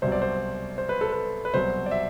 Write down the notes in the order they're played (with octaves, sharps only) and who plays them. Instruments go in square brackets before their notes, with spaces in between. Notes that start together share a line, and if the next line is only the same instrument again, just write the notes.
[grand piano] C2 B2 F#3 C5
D5
C5
C5
B4
A4
B4
B4
C2 B2 F#3 C5
D5
E5